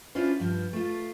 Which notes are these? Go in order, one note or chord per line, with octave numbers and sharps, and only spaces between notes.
C#4 D4 E4 F4 C5
G2 F3
A3 F4